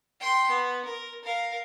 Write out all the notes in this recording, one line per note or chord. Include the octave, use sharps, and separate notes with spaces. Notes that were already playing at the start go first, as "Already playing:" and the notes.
G5 C6
B3
A#4
A#4 F5